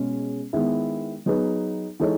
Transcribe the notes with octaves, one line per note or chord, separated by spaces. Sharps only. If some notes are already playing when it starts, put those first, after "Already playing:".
Already playing: B2 G#3 C#4 G#4
D#3 G#3 B3 E4
F#3 B3 D#4 G#4 B4
E3 G#3 D#4 A4 C#5